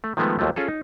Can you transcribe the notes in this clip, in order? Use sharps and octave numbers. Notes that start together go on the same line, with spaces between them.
A3
D#3 F3 G#3 A3 B3
D#2 F3 F#3 A3
C#4 F4 G#4 A4
D#4